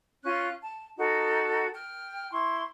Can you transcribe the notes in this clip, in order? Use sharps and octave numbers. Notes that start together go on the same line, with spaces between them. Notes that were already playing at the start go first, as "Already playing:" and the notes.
C#4 F4 F#6
A5
D#4 F#4 A4
G5 F6
E4 C6 C#6